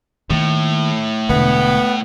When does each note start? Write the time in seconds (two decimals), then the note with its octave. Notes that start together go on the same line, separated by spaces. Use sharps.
0.30 A2 D#3 A#3
1.29 E1 D3 B3